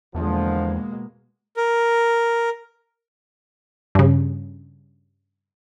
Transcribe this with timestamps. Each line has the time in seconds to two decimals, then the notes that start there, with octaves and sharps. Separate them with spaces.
0.15 E2 B2 D3 F3 G#3 A#3
1.57 A#4
3.95 G2 C#3